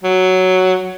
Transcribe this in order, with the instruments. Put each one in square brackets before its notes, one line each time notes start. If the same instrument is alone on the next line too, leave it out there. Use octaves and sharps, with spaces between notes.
[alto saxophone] F#3